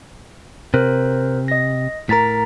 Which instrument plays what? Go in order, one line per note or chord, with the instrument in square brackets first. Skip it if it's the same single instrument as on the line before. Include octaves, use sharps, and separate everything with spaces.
[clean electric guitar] C3 [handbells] A#4 C5 F#6
[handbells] D#5 A#6
[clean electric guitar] A2 A#4 [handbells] A#5 A6 B6